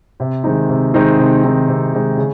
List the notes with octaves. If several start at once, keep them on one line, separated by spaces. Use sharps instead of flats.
C3
D#3 G#3 C4 D#4
C3
D#3 G#3 C4 D#4
C3
D#3 G#3 C4 D#4
C3
D#3 G#3 C4 D#4
C#3